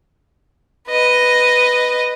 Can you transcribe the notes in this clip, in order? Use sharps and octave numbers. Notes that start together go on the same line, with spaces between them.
B4 D#5